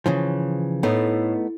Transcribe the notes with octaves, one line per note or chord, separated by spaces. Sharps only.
C#3 E3 F3
A2 A3 B3 D#4